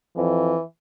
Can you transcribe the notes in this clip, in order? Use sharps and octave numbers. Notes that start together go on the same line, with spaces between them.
F2 E3